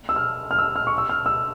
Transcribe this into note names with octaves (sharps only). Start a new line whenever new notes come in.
E6
F6
F6
E6
F6
C#6
E6
F6
E6